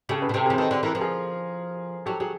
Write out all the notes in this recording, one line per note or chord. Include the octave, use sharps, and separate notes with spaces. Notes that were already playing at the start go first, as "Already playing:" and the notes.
C#3 G4 A4
A4 B4
B2
C3 A4 B4
E3 G#4 A#4
C5
D#3 A4 B4
D3
E3 A#4
F3 B4
G#4 A#4
F#3 G4 A4
F#3 G#4